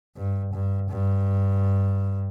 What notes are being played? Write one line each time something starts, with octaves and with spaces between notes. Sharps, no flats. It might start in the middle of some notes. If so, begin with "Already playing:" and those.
G2
G2
G2